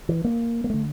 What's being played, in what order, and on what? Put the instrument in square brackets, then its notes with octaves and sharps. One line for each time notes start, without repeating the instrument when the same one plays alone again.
[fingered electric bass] E3
A#3
A#3
D3 A3